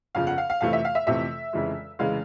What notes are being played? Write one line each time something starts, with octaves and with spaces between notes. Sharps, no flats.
G1 F2 C#3 F3 F5
F#5
F5
F5
F2 C3 E3 A3 F5
E5
F5
E5
F2 C3 E3 A3 E5
F1 F2 C#3 E3 G#3
F1 C#3 E3 G#3 F5